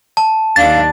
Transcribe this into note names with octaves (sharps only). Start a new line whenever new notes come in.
A5
D#2 D4 F5 A6